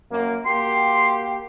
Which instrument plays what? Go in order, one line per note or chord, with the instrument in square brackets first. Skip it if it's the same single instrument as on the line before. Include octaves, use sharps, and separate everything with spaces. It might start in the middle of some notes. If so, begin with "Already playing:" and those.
[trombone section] F#2 A#3
[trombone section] A#3 F#4 G4 [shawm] C6